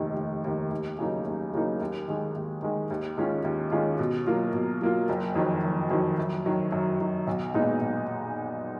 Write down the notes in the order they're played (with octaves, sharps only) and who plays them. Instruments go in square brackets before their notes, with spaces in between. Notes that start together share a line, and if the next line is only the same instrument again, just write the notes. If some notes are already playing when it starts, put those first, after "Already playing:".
Already playing: [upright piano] F1 D#2 D#3
F1
D#2 D#3
D#2
C#3 F#3 A#3 D#4
D#2
C#3 F#3 A#3 D#4
D#2
D#3 G#3
D#2
D#3 G#3
D#2
D#3 G#3 C#4 F4
D#2
D#3 G#3 C#4 F4
B2
F#3 A#3 F4
B2
F#3 A#3 F4
F#1
F2 D#3 F#3
F#1
F2 D#3 F#3
F#2
D#3 F#3
F#2
D#3 F#3
B1
A#2 G#3 B3 D#4
B1